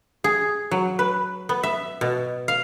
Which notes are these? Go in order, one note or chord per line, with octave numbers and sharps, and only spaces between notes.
G#4
F#3
B4
B3
E5
B2
F5